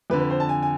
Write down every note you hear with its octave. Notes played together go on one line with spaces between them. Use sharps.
F2 D3 B4
B4
C5
A5
G#5
G#5